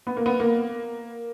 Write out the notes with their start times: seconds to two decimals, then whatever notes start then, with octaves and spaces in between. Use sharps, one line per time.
0.07 B3
0.17 A#3
0.26 B3
0.40 A#3